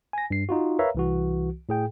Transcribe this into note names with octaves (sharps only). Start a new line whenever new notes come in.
G#5 A#6
G2 C7
D#4 F4 F#4
A#4 B4 C#5 E5 F5 A#5
C2 E3 F#4
A2 G#4 G5